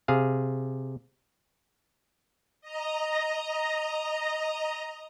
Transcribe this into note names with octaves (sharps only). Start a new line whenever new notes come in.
C3 G#4 F5
D#5 A#5